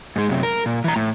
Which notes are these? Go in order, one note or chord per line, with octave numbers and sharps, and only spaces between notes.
G#2 G#3
F#2 C3
A#4
A#2
E3 A#5
A2